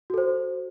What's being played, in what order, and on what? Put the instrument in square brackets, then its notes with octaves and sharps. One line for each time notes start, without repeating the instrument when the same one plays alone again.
[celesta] F#4
A4
C5